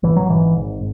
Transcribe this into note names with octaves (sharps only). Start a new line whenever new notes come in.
G#1 E3
F#3
G#2 E3
G#1